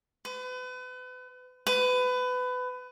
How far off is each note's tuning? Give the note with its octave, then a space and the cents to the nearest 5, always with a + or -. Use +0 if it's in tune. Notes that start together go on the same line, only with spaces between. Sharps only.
B4 +35
B4 +25